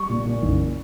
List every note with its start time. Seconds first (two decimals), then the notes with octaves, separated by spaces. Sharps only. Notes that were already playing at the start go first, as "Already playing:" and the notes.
Already playing: G3 C#6
0.09 A#2
0.25 A#2
0.43 F#1